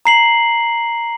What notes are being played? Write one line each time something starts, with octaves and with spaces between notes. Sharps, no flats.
A#5 C7 F#7